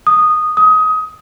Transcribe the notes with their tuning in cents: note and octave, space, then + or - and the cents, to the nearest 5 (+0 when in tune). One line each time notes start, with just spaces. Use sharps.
D#6 -10
D#6 +20